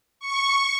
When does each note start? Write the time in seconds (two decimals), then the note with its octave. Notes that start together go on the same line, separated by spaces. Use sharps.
0.20 C#6